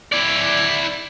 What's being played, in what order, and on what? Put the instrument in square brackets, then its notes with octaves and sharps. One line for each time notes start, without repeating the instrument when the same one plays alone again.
[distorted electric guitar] E4 D5